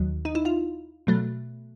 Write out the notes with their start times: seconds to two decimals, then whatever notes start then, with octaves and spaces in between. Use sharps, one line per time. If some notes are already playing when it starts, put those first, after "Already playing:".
Already playing: D#2 D#3 F#3
0.25 D#4
0.35 E4
0.45 F4
1.07 B2 F#3 A3